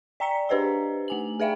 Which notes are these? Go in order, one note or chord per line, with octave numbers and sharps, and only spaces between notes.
D5 G5 A#5 B6 C#7
D4 G4 B4 C5 D#5 A#5
A3 G#5 F#7
G#4 B4 E5 F5 G5